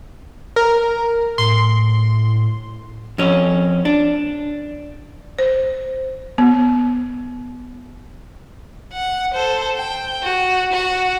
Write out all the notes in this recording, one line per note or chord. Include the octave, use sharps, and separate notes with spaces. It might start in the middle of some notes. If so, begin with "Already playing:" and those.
A#4
A2 C6
F2 C#4
D4
C5
B3
F#5
A4 C5
G5
F#4
F#4